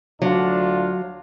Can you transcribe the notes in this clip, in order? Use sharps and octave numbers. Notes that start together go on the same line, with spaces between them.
D2 F#3 D4 F4